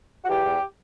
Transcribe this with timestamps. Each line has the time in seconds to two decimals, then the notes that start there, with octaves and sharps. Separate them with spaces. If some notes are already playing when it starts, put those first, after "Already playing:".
0.24 F#4
0.29 E2 G4
0.45 E2